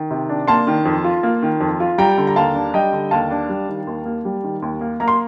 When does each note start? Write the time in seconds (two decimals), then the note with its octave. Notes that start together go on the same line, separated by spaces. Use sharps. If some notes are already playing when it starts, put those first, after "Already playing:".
Already playing: D#3
0.11 C3
0.29 D4
0.48 A#3 A5 C6
0.67 D#3
0.85 F2
1.04 F4
1.23 A#3
1.43 D#3
1.61 F2
1.80 F4
1.98 G3 G5 A#5
2.18 D3
2.27 A#5
2.36 D#2 F5 A5
2.55 D4
2.74 G3 D#5 G5
2.93 D3
3.11 D#2 F5 A5
3.31 D4
3.49 G3
3.68 D#3
3.87 D#2
4.06 A#3
4.25 G3
4.44 D#3
4.62 D#2
4.81 A#3
5.00 A#3 A#5
5.08 C6